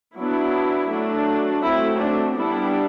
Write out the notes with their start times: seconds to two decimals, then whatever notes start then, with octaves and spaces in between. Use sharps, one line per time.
0.15 F#3 B3 D4 E4
0.89 F#3 A3 D4
1.62 F#3 A3 C4 E4
1.99 D4
2.36 G3 B3 D4 E4